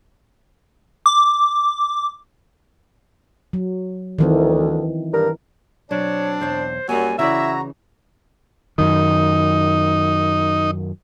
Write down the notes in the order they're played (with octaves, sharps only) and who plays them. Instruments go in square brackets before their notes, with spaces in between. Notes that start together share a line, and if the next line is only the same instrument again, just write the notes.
[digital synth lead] D6
[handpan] F#3
[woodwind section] D2 [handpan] D#3 E3 C4
[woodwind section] G2 A#4
[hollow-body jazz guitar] B2 F#3 [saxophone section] C4 D4 [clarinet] C#5
[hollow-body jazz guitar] B1 E2 C#5 [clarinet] C5
[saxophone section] F#2 F#3 G3 [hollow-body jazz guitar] A#3 C#5 F#5 [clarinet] G#5
[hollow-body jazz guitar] C#3 E3 D5 [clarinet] E4 [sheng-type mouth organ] F#4 A#5 [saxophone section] E5
[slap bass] F#2 D#3 [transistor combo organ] D#4